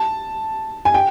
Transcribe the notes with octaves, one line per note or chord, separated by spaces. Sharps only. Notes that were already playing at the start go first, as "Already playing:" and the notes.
Already playing: A5
G#5
G5